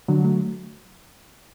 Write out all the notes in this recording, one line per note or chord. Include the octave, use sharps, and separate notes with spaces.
D3 F#3
F#3 A3